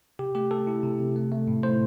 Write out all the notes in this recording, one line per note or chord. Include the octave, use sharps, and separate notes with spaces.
C3 G4
A3 G4
A3 A4
E4
C3
C3
A3
A3
A2
A2 C5